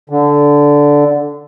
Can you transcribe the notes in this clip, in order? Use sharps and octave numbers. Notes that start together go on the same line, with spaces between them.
D3